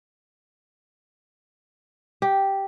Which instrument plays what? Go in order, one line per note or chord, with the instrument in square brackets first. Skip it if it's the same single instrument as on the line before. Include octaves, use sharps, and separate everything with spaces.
[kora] G4